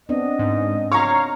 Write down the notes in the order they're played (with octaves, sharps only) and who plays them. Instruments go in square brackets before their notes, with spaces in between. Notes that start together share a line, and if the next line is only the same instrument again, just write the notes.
[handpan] B3 C4 D4 [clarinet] D#5
[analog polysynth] G#2
[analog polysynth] C#5 F5 [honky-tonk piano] A#5 C#6